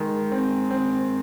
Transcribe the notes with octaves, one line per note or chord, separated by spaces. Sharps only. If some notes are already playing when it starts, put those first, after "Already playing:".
Already playing: D#3 G#3
C4
C4